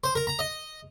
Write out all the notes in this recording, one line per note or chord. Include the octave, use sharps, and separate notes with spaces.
C5
A#4
A#5
D#5